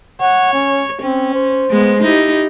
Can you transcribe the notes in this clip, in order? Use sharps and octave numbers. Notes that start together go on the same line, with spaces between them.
C#5 F#5
C#4
C4 C#4
C5
G#3 B3
D#4 E4 G4